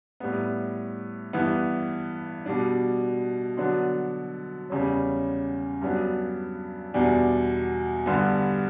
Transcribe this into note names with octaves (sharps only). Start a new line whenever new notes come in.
A2 G3 B3
G2 E3 B3
B2 G3 D4
D3 F#3 B3 D4
E2 C#3 G3 C#4
G2 F#3 B3 D4
E2 B2 G3 D4
G2 D3 G3 B3